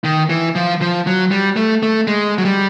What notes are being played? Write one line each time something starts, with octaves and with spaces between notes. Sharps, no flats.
D#3
E3
F3
F3
F#3
G3
A3
A3
G#3
F#3
G3